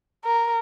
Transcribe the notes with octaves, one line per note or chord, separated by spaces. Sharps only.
A#4